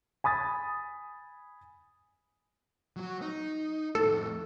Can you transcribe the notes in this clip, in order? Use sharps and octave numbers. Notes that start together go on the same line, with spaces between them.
G#5 B5 D#6 A6
F#3 F#4
D#4
F2 A2 A4